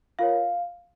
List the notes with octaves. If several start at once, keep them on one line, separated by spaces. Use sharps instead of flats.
F4 A#4 C#5 F5